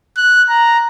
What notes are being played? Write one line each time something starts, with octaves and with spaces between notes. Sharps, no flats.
F#6
A#5